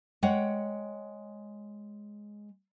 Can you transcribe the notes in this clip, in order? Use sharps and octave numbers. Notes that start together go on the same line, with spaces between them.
G#3 C#5 F#5 G5